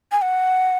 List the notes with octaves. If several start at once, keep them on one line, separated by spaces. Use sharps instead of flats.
G#5
F#5